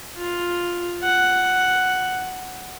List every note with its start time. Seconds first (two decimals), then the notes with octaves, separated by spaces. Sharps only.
0.17 F4
1.03 F#5